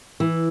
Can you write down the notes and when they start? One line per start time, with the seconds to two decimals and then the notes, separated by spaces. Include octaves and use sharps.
0.20 E3